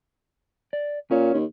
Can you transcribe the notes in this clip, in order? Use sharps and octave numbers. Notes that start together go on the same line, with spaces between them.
D5
A#2 C#4 C#5
D#2